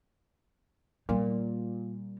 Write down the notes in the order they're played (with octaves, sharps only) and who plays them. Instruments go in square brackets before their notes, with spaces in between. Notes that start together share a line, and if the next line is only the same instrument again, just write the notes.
[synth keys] A#2 [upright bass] G3